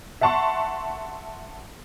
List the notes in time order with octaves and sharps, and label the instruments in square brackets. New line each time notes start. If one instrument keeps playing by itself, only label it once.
[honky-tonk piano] E5 F#5 A5 C6 C#6